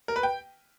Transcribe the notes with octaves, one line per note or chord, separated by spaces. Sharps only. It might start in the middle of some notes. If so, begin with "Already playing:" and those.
A#4
B4
G5